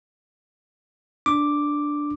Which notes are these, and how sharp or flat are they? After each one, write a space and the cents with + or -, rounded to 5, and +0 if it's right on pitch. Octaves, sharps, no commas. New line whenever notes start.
D4 +0 D6 +0